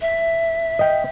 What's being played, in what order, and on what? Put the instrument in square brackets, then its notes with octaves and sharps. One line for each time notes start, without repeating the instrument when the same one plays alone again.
[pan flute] E5
[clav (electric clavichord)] D#5 G5